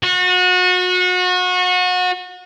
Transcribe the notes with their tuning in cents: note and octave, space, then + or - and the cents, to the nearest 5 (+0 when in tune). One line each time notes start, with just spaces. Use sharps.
F#4 -30